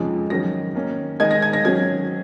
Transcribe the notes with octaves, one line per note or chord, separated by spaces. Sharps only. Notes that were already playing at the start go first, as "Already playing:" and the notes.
Already playing: F2 C#3 F3 G#3 D#4
D#3 F#3 C#4 A#6
D#3 A#3 C#4
D#3 G#3 D#4 G#6
A#6
G#6
A#6
D#3 F#3 C#4 G#6